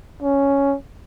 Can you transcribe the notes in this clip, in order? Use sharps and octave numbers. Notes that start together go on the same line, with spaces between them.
C#4